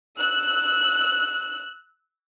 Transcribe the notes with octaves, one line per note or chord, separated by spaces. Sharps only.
E6 F#6